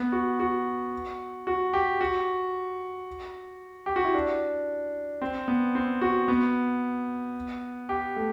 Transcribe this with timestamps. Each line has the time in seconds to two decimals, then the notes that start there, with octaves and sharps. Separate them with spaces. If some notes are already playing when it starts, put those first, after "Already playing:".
Already playing: B3
0.12 F#4
0.40 F#4
1.47 F#4
1.73 G4
2.01 F#4
3.86 G4
3.96 F#4
4.05 E4
4.14 D4
5.22 C4
5.48 B3
5.75 C4
6.01 F#4
6.28 B3
7.89 G4
8.16 A3